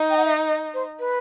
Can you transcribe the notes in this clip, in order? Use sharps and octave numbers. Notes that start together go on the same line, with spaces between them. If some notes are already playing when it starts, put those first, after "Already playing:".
Already playing: D#4
G5
F#5
E5
D#5
C5
B4